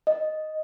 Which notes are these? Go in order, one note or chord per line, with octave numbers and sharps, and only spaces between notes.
D#5